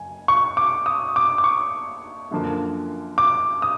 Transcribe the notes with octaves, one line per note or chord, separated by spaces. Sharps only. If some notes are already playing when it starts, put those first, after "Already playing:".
Already playing: F#1 G#5
C#6
D6
D#6
D6
D6
C#6
F#2 D3 F3 A#3
D6
D#6